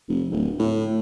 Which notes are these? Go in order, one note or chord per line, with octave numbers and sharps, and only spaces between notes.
F1
D1
A2